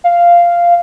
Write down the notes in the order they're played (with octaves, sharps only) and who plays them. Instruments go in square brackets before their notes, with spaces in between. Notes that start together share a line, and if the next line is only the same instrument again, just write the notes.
[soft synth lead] F5